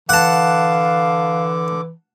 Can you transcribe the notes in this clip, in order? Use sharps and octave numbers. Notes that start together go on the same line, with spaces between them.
D3 E3 F5 F#5 A5 D6